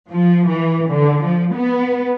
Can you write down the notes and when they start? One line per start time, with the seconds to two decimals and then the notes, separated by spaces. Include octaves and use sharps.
0.10 F3
0.49 E3
0.90 D3
1.23 F3
1.55 B3